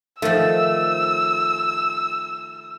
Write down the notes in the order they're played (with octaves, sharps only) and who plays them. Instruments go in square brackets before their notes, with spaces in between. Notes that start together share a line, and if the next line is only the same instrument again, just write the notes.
[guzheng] D#3 F3 [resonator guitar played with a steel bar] A3 [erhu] E6